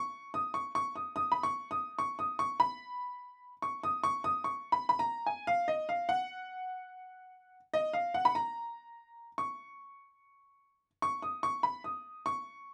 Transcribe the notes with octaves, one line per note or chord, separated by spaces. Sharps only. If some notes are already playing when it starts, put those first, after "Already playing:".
Already playing: C#6
D#6
C#6
C#6
D#6
D#6
B5
C#6
D#6
C#6
D#6
C#6
B5
C#6
D#6
C#6
D#6
C#6
B5
B5
A#5
G#5
F5
D#5
F5
F#5
D#5
F5
F#5
B5
A#5
C#6
C#6
D#6
C#6
B5
D#6
C#6